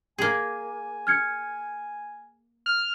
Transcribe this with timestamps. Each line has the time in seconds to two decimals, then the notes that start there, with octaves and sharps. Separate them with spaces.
0.18 A#3 G#4 G#5
1.07 F6 G#6 C#7
2.66 F6